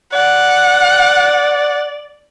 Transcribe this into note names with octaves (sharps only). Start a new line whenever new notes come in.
D5 F#5